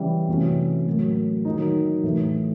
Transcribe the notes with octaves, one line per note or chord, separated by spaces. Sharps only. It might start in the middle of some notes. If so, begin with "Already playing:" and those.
Already playing: C#3 E3 G3
C3 E3 A3 C#4 F#4
A2 F#3 A#3
D#3 F#3 A#3 D#4
A2 E3 A3